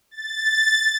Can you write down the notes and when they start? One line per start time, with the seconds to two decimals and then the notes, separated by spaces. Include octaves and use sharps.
0.11 A6